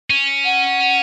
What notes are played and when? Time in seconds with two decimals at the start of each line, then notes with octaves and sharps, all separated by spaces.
0.10 C#4
0.45 F#5